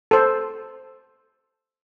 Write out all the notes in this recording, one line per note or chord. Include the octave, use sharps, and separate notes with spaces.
A4 C5